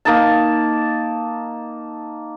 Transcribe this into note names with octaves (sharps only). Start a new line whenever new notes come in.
A#3 D#4 A5